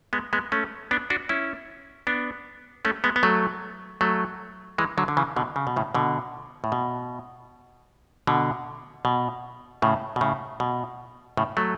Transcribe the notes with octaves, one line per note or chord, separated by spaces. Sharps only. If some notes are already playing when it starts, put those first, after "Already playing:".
G#3 B3
G#3 B3
A3 C#4
B3 D4
D4 F#4
C#4 E4
B3 D4
A3 C#4
G#3 B3
B3
F#3 A3
F#3 A3
E3 G#3
D3 F#3
D3
C#3 E3
B2 D3
C#3
B2
A2 C#3
B2 D3
A2
B2
B2 D3
B2
A2 C#3
B2
A2 C#3
B2
A2 C#3
F#3 A3